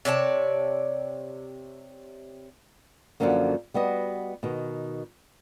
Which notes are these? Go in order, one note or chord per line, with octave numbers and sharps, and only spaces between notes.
C3 C#5 D5 A5
F#2 A#2 D3 F3 A#3 C#4
G3 B3 F#4 D#5
B2 D#3